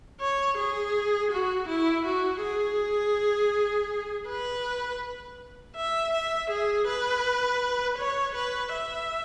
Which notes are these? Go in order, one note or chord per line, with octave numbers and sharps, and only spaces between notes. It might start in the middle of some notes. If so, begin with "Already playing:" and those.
C#5
G#4
F#4
E4
F#4
G#4
B4
E5
E5
G#4
B4
C#5
B4
E5